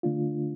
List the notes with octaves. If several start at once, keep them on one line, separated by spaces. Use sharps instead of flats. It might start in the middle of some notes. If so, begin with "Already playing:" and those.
D3 A3 D4 F4